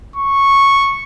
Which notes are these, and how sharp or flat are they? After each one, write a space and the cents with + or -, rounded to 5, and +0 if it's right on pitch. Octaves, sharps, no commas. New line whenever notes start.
C#6 -5